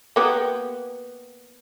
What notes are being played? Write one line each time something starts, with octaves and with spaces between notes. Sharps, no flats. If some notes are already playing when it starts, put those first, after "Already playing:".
A#3 B3 G4